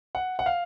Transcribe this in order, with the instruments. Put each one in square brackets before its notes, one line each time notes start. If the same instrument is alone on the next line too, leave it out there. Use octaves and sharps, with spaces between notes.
[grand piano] F#5
F#5
F5